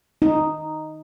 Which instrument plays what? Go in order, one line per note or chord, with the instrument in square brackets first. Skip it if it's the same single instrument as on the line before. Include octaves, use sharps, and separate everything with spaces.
[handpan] D#4